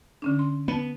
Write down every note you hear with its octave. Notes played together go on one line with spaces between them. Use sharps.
D3 C#4 D4
C6
B3 A5 B5